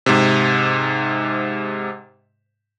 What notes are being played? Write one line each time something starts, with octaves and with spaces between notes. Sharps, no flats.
G#2 C3